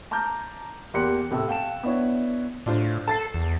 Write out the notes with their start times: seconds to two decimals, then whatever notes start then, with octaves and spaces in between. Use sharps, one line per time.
0.11 A5 A#5 D6 F6 G6
0.94 E2 A#3 G4 C6 F#6 C#7
1.31 A2 C3 A3 A4 E6
1.48 F5 G5 A5 E7
1.83 B3 D4 E4 C#5
2.66 A2 D4 F4 C5
3.08 A4 A5 A6 C7
3.34 E2